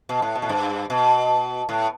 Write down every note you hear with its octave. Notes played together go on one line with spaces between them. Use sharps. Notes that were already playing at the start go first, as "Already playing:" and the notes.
B2
A2
B2
A2
G2
B2
A2